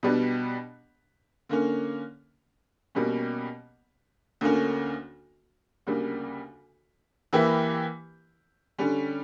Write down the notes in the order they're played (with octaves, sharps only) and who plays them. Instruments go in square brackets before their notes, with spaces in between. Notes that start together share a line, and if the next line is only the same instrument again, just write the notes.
[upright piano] B2 G3 B3 D4
D3 A#3 C#4
B2 G3 A#3 C#4
D2 D3 A#3 C#4
D2 C#3 G3 A#3
E3 A#3 E4 G4 B4
D3 G3 C#4